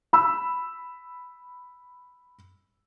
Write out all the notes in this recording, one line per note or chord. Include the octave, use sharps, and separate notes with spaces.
B5 E6